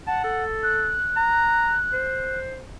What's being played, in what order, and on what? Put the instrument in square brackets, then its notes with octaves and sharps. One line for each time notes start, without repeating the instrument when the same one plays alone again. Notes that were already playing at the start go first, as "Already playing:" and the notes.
[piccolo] F#5 [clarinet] A5
[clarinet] A4
[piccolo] F#6
[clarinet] A#5
C5